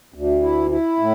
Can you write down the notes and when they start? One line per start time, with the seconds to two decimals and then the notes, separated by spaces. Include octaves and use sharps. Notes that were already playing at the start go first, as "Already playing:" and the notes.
0.14 D2
0.43 E4
0.70 E4
0.99 A2